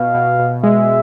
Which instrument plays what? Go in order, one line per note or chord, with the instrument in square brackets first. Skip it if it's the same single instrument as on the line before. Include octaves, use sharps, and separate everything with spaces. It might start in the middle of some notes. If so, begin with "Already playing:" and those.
Already playing: [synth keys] B2 [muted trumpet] F5
[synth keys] B2
B2
[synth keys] G#3 [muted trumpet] E5